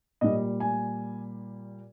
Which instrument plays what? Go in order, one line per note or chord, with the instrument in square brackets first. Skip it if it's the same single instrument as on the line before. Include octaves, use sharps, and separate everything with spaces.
[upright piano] A#2 G3 D#5
G#5